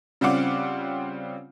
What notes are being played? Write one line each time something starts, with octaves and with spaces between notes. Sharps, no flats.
C#3 G3 C4 F4 F#5 D6